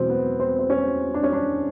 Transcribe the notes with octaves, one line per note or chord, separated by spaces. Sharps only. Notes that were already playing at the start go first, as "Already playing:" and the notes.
Already playing: E1 E2 B2 F#3 C4
B3
C4
C4
C#4
D4
C#4
D4